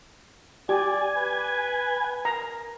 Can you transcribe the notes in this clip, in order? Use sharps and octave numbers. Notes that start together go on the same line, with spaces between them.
G4 D5 G#5
B4
A#4 A#5